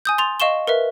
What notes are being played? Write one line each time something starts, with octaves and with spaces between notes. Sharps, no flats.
G#5 D#6 G6
C6 A6 F7
D#5 F5 C#6 E7 G7
A#4 B4 E5